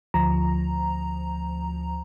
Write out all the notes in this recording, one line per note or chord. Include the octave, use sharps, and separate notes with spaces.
D2 F3 A#5